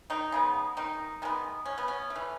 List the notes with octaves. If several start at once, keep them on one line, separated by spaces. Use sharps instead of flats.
D#3 D#4
C#3 G#3 B3
D#3 D#4
D#3 G#3 B3
C#4
B3
C#4
A3
E3